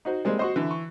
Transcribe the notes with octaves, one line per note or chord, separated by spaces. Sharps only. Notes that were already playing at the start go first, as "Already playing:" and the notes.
D#4 F#4 C5
G3 G#3 A#3 C4 C5
F#4 C5 D#5 C#6
D3 E3 E5
C#6